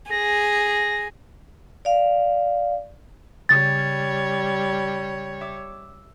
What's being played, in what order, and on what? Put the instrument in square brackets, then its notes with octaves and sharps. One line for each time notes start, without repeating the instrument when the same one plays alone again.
[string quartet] G#4 [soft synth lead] A#6
[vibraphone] D5 F5
[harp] C#3 [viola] G3 C#5 [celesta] A6
[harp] E5 D6 E6